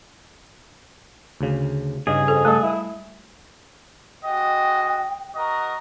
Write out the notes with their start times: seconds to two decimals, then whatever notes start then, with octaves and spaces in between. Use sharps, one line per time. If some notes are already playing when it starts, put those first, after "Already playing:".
1.41 D2 C#3
2.07 G2 C#3 D#4 G#4
2.28 F2 A4
2.45 G3 A3 A4
2.63 E4
4.24 G#3 F#4 D#5 G5
5.35 F#4 A#4 D#5